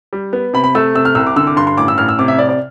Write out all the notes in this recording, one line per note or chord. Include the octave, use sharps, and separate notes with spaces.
G3
B3
C3 B5
B5
A3 E6
C3 E6
F6
C2 E6
D6
D3 E6
D6
G2 C6
C6
A1 D6
E6
A1 F6
E6
C3 D6
E5
C3 D5
D5